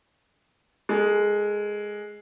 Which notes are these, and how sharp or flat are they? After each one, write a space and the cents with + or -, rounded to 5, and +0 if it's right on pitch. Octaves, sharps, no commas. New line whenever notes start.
G#3 +0 A4 +35